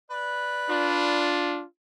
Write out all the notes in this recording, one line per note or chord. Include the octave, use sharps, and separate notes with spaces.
B4 D5
D4 F4